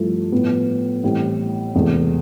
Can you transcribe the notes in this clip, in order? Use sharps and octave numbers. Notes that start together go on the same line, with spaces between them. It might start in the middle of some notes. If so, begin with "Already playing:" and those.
Already playing: G2 F3 A3 E4 A4
A2 F3 B3 F4
A1 A2 G3 C4
E1 E2 C3 E3 A3